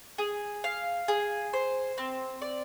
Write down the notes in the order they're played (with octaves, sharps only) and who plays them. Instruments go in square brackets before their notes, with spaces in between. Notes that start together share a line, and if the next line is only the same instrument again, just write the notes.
[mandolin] G#4
F5
G#4
C5
C4
D5